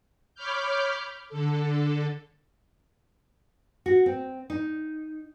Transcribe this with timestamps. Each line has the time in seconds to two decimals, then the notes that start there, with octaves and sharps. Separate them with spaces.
0.34 C#5 B5 D6 F6 G6
1.29 D3 A4
3.86 F#4
4.06 C4
4.50 D#4